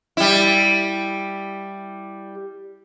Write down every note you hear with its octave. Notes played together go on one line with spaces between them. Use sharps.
G3 E4